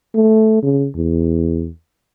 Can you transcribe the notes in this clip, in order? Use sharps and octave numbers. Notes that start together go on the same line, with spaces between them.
A3
C#3
E2